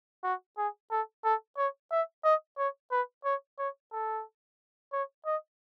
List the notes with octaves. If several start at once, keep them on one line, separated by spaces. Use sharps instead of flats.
F#4
G#4
A4
A4
C#5
E5
D#5
C#5
B4
C#5
C#5
A4
C#5
D#5